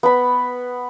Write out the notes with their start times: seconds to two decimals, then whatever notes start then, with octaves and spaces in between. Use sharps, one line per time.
0.03 B3 B5